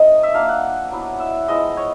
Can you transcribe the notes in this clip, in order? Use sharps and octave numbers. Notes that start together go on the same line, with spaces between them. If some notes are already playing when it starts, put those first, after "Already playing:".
Already playing: A3 C4 D#4 D#5
E5
A#3 D4 F4 F5
F#5
F#3 B3 E4
E5
F3 G#3 B3 E4 D#5
C#5